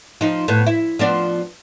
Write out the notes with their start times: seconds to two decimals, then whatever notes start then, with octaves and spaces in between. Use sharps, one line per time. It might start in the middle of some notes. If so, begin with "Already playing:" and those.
0.21 F3 D#4
0.48 A2 B3
0.66 E4
0.99 F3 B3 D4